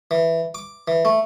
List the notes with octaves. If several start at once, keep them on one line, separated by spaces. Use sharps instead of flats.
E3
D6
E3
A3